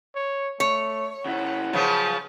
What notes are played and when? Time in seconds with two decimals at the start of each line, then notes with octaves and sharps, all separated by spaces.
0.15 C#5
0.60 A3 C#5
1.25 C#3 E4 F#5
1.73 C#3 F3 F#3 B3 A5